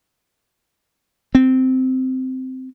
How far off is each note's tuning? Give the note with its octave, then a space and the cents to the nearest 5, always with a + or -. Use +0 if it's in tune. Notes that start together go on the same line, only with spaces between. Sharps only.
C4 -10